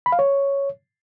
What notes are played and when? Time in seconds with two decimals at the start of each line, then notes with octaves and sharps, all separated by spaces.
0.06 B5
0.12 F5
0.19 C#5